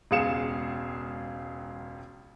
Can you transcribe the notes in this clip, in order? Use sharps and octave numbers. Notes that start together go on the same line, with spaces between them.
E1 C#2 G#4 F5 C#7 E7